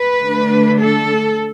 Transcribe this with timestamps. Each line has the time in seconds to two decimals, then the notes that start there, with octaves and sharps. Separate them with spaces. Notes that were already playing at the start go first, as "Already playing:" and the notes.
Already playing: B4
0.19 D3 A3 D4
0.79 A4